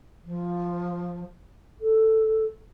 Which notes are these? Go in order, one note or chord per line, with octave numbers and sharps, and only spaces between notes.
F3
A4